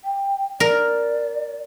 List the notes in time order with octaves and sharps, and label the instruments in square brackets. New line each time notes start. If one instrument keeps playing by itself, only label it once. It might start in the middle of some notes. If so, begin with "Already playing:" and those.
[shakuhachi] G5
[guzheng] A#4 [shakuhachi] D5